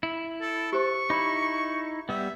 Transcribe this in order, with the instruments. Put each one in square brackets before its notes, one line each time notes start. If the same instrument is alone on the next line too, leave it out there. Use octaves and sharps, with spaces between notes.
[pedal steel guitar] E4
[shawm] A4
[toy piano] G4 C5 [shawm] C#6
[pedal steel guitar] D#4 E4 [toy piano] D5 B5 D6
[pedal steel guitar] G3 B3 [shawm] E5